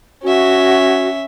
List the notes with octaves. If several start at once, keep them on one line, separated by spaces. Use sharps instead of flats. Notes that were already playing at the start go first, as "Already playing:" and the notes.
C#4 F#4 E5